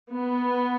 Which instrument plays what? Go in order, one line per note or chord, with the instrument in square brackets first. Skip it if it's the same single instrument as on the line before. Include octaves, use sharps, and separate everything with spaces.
[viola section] B3